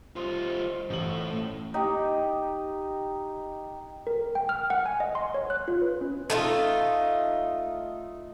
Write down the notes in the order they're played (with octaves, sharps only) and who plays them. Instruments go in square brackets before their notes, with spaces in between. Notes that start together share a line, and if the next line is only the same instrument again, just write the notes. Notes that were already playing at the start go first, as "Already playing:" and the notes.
[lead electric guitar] G3 F4 [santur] C5 D#5
[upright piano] A1 F#7 [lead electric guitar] A2
[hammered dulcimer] D#4 G4
[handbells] A#4
G5
F6
F#5
G#5
D#5
C6
C#5
F#6
F4
B4
C#4
[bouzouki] A3 D#4 F4